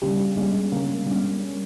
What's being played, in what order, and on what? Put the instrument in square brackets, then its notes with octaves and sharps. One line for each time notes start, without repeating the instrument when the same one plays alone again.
[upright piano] C#3 [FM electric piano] G3
[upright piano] G3 C#4 [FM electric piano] G#3
[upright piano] C#3 [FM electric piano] A#3
[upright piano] G3 C#4